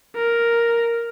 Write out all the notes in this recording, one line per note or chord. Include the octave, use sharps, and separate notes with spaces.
A#4